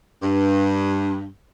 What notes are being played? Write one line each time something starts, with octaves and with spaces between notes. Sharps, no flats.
G2